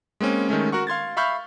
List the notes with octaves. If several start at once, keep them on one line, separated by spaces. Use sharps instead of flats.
G#3 A#3 C4 C#4
D#3 G#3 A3 C#4
F#4 A#4 F#5 C#6
F5 C6 G#6 A6
E5 F5 B5 C#6 F6 G6